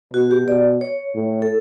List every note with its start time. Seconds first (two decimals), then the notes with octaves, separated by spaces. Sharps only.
0.14 B2 F#4
0.31 G4
0.47 B2 D5
0.81 C#5
1.15 A2
1.42 A4